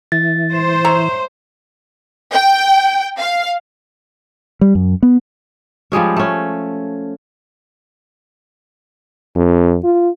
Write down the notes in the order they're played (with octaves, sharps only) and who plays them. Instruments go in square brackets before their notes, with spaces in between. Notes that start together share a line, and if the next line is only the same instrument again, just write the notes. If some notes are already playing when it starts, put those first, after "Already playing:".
[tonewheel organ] E3 [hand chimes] A6
[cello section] C5
[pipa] C#5 E5 A#5
[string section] G5
F5
[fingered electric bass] G3
F#2
B3
[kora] F3 G3 G#3 C#4
A3 C#4
[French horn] F2
F4